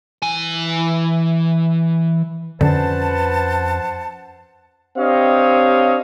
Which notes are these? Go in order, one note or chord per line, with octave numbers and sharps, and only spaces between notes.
E3 G#5
F2 D3 C#4 B4 C5 F#5 A5
C4 D4 G4 C#5 D#5 F5